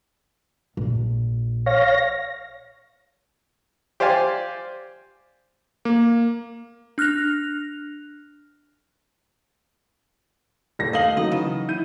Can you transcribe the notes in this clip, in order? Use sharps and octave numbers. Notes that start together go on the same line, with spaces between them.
A#1
C#5 F5 A#6
G4 C5 D5 F5 G#5
A#3
D4 F6 F#6 A#6 F7
D#1 A#6
A3 D#5 F5 D#6 F#7
D#3 E3 F#3 D#5
C#3
E4 G6 D#7